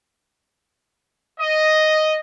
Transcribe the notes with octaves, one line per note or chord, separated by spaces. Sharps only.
D#5